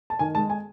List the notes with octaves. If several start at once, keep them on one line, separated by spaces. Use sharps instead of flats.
A5
D#3 G#5
G#3 A5
G#5